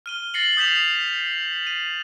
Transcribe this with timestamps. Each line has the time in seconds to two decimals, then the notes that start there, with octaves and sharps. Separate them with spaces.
0.06 F6 D#7 G7
0.34 A6 A#6 C7 C#7 F#7
0.57 D#6 G6 B6 E7 F7
1.67 D#7